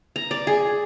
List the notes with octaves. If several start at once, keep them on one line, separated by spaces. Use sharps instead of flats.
A#5
D5
G#4